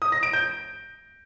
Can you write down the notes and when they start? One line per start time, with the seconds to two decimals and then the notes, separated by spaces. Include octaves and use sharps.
0.02 D#6
0.12 A#6
0.23 D7
0.33 G6